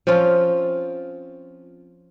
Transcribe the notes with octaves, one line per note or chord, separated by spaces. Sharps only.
F3 C4 C#4 F4